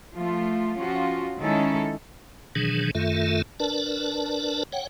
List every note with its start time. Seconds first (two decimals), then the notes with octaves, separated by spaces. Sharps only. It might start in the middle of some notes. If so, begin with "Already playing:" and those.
0.15 F3 A3 F4
0.78 F3 C#4 F4 F#4
1.40 D#3 G#3 C#4 D#4 E4 A4
2.55 B2 D#3 E3 F#3 D4 G#4
2.95 F#2 D#3 A3 F4 A4 E5
3.60 D4 A#4 B4 D5 A5
4.73 C#5 F#5 G5